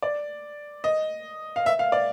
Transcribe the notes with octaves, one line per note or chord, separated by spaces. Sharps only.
D5
D#5
F5
E5
F5
D5